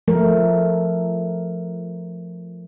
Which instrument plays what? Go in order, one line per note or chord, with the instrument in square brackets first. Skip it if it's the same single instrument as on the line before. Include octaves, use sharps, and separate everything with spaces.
[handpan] F3 A3 A#4